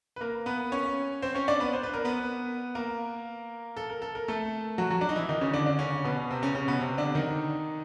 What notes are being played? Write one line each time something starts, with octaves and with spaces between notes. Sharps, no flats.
B4
A#3 A#4
B3 B4
C#4 C#5
C4 C5
C#4 C#5
D4 D5
B3 B4
C5
B4
A#4
B3 B4
A#3 A#4
A4
A#4
A4
A#4
A3 A4
F#3 F#4
F#3 F#4
D4
D#4
E3 E4
D#3 D#4
C#3 C#4
D3 D4
D3 D4
C#3 C#4
B2 B3
C3 C4
C#3 C#4
C#3 C#4
B2 B3
C3 C4
D3 D4
D#3 D#4